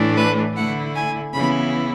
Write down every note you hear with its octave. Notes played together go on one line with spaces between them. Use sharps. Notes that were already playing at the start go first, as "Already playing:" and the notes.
Already playing: A2 E3 A3 D4
B4
D3 A3 E4 F#5
G#5
C#3 E3 B3 E4 B5